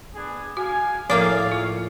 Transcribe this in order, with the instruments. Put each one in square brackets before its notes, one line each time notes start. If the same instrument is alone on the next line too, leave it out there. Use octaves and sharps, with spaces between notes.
[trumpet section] B3 D4 G#4
[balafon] F#4 [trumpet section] F5 G#5
[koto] A2 A#3 D5 [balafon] F3 D6 [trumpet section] G#4 F5
[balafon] F4